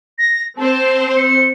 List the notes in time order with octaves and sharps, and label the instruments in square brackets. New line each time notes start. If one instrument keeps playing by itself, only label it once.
[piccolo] A#6
[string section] C4 C5 [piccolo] A5
[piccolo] C#7